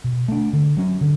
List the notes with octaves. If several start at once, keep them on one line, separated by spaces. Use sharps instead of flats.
B2
A3 D4
D3
F#3 C#4
D3